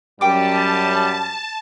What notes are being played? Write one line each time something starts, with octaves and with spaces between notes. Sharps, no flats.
F#2 G3 G5 A5 D6